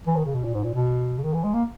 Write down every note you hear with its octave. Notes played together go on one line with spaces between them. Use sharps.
E3
D#3
C#3
B2
A#2
G#2
A#2
B2
C#3
D#3
E3
G#3
A#3